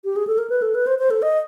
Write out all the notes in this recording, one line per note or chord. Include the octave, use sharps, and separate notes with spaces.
G4
G#4
A4
A#4
B4
A4
B4
C5
C5
A4
D#5